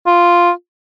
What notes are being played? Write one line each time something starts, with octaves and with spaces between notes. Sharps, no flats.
F4